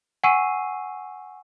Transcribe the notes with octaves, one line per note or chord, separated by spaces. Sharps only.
F#5 G#5 C#6 E6 C7 D#7